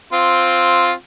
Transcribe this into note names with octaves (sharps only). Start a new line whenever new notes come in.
C4 F4